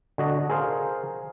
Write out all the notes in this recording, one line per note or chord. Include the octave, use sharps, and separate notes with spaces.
D3 F#4 D#5
G#4 A#4 C5 F5